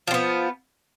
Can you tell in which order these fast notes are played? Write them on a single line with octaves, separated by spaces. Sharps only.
F3 C4 B3